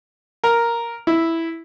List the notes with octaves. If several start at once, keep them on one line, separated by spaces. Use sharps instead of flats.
A#4
E4